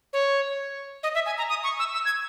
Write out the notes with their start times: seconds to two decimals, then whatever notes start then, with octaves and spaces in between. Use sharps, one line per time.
0.13 C#5
1.03 D#5
1.15 E5
1.26 G#5
1.38 A#5
1.49 D#6
1.64 C#6
1.79 E6
1.94 E6
2.05 G#6